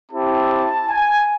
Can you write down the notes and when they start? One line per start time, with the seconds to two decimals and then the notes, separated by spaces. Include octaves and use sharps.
0.10 C4 E4 G4 A5
0.89 G#5